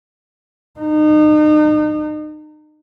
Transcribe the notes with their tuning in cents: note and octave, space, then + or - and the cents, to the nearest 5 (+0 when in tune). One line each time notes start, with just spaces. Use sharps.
D#4 -35